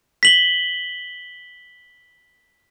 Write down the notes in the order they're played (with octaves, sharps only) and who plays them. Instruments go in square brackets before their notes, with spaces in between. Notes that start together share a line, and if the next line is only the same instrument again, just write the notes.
[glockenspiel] B6 F#7 G7